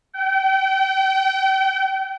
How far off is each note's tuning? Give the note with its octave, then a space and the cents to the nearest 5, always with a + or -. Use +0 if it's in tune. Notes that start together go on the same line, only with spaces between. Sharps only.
G5 -35